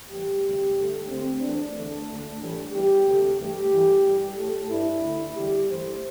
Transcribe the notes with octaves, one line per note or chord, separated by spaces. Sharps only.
A2 E3 G3 G4
D2 C3 G3
G2 D3 A3
D2 D3 A3 C4
E2 E3 A3 D4
E2 D3 A3
D2 D3 A3
A2 E3 G3
E2 E3 G3 G4
D2 C3 A3
G2 E3 A3 G4
G2 E3 A3
G2 G3
A2 A3 A4
G2 G3 E4
D2 D3 A3
E2 D3 G3 G4
G2 E3 A3 C5